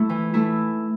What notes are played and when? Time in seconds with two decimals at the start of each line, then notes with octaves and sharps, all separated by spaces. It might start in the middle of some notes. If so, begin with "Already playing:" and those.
Already playing: A3 E4
0.10 E3
0.34 A3 E4